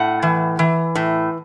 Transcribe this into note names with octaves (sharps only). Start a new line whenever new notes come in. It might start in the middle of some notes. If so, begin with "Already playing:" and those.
Already playing: A2 F#5
E3
E3
A2